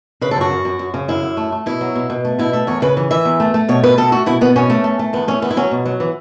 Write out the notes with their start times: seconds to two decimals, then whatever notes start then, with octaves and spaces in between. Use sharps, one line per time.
0.21 C#3 B4
0.31 A4
0.36 F#2 F#4
0.51 F#2
0.65 F#2
0.79 F#2
0.94 C#3
1.08 F#2 E4
1.23 F#2
1.37 A3
1.52 A3
1.66 B2 E4
1.81 F#3
1.95 B2
2.10 B2
2.25 A3
2.39 B2 E4
2.53 A3 E5
2.67 E2 C#5
2.82 C#3 B4
2.97 E3
3.11 E3 E5
3.25 E2
3.40 A3
3.54 A3
3.68 B2 C#5
3.83 B2 B4
3.98 B2 A4
4.12 A3 F#4
4.26 B2 E4
4.41 B2 B3
4.56 B2 C#4
4.70 A3
4.84 A3
4.99 A3
5.13 E2 B3
5.28 A3 C#4
5.42 E2 B3
5.51 E4
5.57 F#3 C#4
5.71 B2
5.85 F#3
6.00 E3